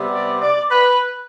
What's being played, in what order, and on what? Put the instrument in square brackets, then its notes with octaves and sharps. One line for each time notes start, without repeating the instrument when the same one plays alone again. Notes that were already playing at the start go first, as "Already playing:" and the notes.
Already playing: [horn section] C3 G3 B3
D5
D5
B4